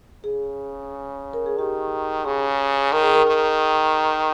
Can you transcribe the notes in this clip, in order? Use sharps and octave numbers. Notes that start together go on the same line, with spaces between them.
C#3 G#4
A#4
G#4
D#3 G4
C#3 G#4
D#3 A#4
G#4
A#4
D#3